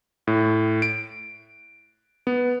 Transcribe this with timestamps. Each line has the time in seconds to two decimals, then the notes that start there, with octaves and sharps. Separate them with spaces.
0.27 A2
0.82 D7
2.27 B3